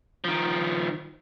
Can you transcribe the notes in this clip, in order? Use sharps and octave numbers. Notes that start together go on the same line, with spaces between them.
D#3 F3